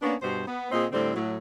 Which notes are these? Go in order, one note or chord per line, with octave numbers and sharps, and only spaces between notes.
A#3 B3 C#4 D4
G2 B2 C5
B3
A#2 C4 G#4 C5 D#5
A2 D3 G3 C4
A2 F#3